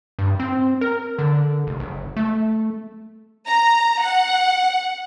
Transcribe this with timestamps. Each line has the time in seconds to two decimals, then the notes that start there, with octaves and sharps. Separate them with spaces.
0.19 G2
0.40 C4
0.81 A#4
1.18 D3
1.67 F1
1.80 F#1
2.16 A3
3.48 A#5
4.03 F#5